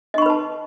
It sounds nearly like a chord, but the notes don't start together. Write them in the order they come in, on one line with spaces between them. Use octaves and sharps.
D#5 C#6 B5 B4 A5